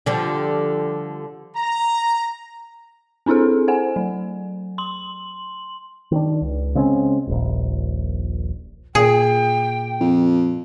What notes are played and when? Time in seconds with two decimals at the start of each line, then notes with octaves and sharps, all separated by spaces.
0.06 D3 F3 G3
1.56 A#5
3.26 C4 D4 E4 G#4 A4
3.68 C5 F#5 G#5
3.96 F#3
4.78 C6 F#7
6.11 D#3 C4 D4
6.42 C#2
6.75 C#3 G#3 C4 C#4
7.28 D#1 A#1
8.95 A#2 G#4 G5
10.01 F2